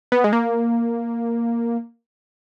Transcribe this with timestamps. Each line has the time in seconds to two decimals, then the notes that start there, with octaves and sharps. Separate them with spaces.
0.12 B3
0.24 G#3
0.33 A#3